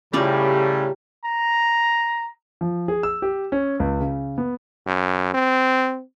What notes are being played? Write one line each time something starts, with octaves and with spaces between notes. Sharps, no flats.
A2 C#3 G3 C#4 F4 G4 D5 A#5
A#5
F3
G#4
E6
G4
C#4
C#2
C#3
B3
F#2
C4